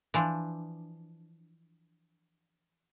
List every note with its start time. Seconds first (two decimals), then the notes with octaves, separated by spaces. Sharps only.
0.14 E3 F3 D4